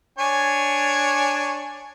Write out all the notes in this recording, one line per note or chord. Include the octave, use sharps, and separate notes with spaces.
D4 C#5 G#5